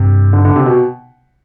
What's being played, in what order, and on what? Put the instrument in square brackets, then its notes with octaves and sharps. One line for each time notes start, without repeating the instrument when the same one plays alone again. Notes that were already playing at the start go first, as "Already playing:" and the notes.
Already playing: [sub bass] G2 [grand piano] C3
[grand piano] D3
D3
C3
B2